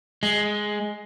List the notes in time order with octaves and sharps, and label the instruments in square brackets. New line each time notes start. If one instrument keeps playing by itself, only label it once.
[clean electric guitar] G#3